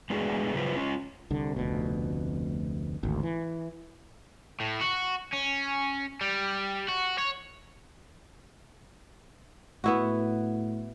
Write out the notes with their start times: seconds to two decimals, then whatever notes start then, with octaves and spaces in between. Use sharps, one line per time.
0.10 G#3 A3 B3 D4 F#4 G#4
0.54 C#3 F#3 G3 F4 B4 C5
0.76 C#4 F4
1.31 C2 D3
1.56 F1 D2 B2
3.03 G#1 D2
3.23 E3
4.60 A2
4.81 F#4
5.33 C#4
6.21 G3
6.88 F#4
7.18 C#5
9.84 A2 B3 E4 F#4